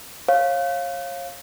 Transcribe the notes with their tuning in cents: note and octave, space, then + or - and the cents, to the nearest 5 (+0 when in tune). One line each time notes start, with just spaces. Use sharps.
C#5 -30 F5 +0